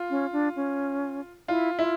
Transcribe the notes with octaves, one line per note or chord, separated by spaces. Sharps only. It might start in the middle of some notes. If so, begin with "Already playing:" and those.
Already playing: F4
C#4
D4
C#4
E4 F4
E4 F4